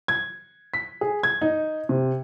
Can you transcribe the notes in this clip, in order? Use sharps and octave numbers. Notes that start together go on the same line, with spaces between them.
G#6
B6
G#4
G#6
D#4
C3